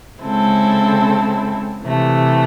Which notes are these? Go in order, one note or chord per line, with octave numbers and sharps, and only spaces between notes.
C#3 G#3 C4 E4 A4
C3 E3 A3